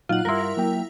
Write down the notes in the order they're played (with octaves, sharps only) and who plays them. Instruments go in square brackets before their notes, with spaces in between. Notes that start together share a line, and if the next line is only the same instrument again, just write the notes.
[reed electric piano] A#2 F#3 D#4 [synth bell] F4 F#5
[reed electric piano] G2 G3 C6 [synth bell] E4 A#4
[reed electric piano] F#3 A#3 G5